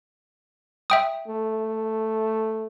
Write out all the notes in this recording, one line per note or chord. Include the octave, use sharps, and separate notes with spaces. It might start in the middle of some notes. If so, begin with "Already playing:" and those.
E5 G5 D#6
A3